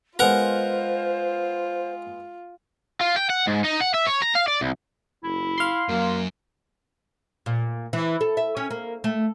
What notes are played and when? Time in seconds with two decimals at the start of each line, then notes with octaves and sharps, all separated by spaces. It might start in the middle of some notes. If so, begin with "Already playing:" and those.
0.19 G#3 B3 F4 A#4 C5 F#5 A#5
3.01 F4
3.16 G5
3.30 F#5
3.47 G#2
3.64 D#4
3.81 F#5
3.94 E5
4.07 C#5
4.22 A#5
4.35 F5
4.48 D5
4.61 C2
5.23 F#1 E4
5.58 F5 C6
5.89 F#2 F#3 A#3
7.46 A#2
7.93 E3
8.21 A4
8.37 E5
8.57 C#4
8.71 A#3
9.04 A3